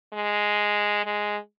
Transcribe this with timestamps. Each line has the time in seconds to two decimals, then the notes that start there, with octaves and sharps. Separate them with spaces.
0.13 G#3
1.05 G#3